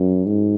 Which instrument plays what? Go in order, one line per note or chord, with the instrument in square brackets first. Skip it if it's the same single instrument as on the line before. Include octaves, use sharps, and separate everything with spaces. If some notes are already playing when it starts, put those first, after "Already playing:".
Already playing: [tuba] F#2
G#2